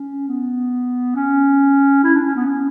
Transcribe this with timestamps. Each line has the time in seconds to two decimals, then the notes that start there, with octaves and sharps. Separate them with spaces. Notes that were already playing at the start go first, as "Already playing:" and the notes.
Already playing: C#4
0.28 B3
1.16 C#4
2.04 E4
2.15 D4
2.25 C#4
2.36 B3
2.46 C#4